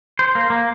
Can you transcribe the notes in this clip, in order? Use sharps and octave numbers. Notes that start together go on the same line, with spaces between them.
C5
A#3
A#3